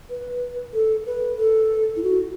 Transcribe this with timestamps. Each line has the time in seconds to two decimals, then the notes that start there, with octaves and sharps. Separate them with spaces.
0.10 B4
0.74 A4
1.06 B4
1.39 A4
1.96 E4
2.03 F#4